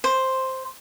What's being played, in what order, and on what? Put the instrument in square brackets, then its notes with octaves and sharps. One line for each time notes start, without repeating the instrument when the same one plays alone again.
[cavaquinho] C5